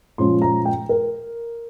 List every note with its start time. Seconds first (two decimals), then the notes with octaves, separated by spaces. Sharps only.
0.18 A#2 F3 G#3 C#4 C6
0.42 A#5
0.65 G5
0.89 A#4